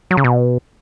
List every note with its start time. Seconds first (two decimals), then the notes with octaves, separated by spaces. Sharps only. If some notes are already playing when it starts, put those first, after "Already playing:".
0.11 F#3
0.17 C#3
0.24 B2